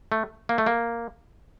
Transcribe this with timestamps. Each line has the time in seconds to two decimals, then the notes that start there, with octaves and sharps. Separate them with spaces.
0.12 A3
0.49 A#3
0.58 A3
0.66 A#3